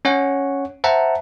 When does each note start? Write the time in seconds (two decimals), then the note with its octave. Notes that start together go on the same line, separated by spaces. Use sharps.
0.05 C#4 C#5 F#5
0.84 C5 E5 F#5 A5 A#5